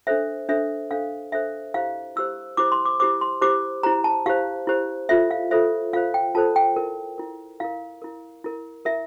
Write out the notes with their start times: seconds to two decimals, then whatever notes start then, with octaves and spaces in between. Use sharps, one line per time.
0.07 D4 A4 C5 E5
0.49 D4 A4 C5 E5
0.91 D4 A4 C5 F5
1.32 D4 A4 C5 E5
1.74 E4 G4 C5 F5
2.16 E4 G4 C5 E6
2.57 E4 G4 C5 D6
2.72 C6
2.85 D6
3.00 E4 G4 C5 D6
3.21 C6
3.41 E4 G4 C5 D6
3.83 E4 G4 C5 A#5
4.04 A5
4.26 E4 G4 C5 F5
4.67 E4 G4 C5
5.09 F4 A4 C5 E5
5.31 F5
5.51 F4 A4 C5 E5
5.93 F4 A4 C5 F5
6.14 G5
6.35 F4 A4 C5 A5
6.56 G5
6.76 E4 A#4
7.18 E4 A#4
7.60 E4 A#4 F5
8.02 E4 A#4
8.44 E4 A#4
8.85 E4 A#4 E5